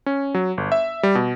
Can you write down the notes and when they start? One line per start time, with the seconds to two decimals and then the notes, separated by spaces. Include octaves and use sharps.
0.06 C#4
0.34 F#3
0.58 G1
0.72 E5
1.03 G3
1.15 B2